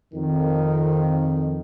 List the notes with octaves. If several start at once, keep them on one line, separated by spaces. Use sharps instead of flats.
F2 D#3